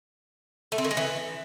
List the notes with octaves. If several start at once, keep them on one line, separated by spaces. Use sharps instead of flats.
A3
C4
D#3
G#3
E3